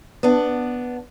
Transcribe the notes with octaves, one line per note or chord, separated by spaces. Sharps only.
B3 D4